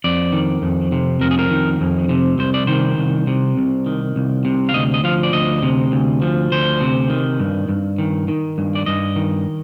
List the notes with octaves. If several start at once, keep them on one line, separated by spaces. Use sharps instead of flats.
F2 D5
D#3
F2
C3
F2 A#4
G#4
A#4
D#3
F2
C3
C2 C5
D5
D#3 C5
C2
C3
C2
D#3
C2
C3
F5
D2 D#5
D#5
F3 F5
D5
D2 D#5
C3
D2
F3
D2 C5
C3
D#3
G2
G2
D#3
D#3
G2
D5
G2 D#5
D#3